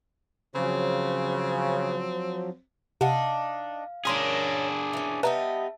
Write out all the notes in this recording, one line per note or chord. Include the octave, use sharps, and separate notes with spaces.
C#3 F3 F#3 C4
C3 D4 D#4 F5 F#5
C#4 D4 G#4 A#4 C#5 C6 B6
E3 C#4
G3 B3 D#4 B4 E5 A5 A#5